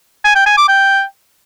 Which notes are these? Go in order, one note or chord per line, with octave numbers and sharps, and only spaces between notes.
G#5
G5
G#5
D6
G5